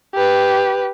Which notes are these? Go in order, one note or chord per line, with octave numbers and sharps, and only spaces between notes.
G4 B4